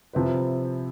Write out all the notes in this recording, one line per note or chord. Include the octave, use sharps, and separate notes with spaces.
C3 F3 C4 E4 B4